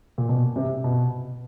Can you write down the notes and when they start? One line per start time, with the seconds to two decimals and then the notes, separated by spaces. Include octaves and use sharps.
0.18 A#2
0.29 B2
0.56 C3
0.84 B2